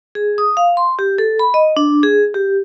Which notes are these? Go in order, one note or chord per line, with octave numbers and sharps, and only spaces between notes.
G#4
D#6
F5
C6
G4
A4
B5
D#5
D4
G#4
G4